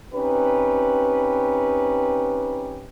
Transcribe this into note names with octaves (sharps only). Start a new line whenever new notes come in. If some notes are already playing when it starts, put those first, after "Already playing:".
C4 C#4 D#4 G4 B4